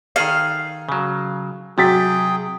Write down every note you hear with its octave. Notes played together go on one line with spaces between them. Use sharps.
D#3 G#4 A4 F5
C#3 F#3
C3 F#3 G#4 G5 A6 B6